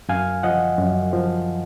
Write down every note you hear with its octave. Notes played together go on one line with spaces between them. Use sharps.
F#2 F5 G#5
F3 D#5 F#5
F#2
F3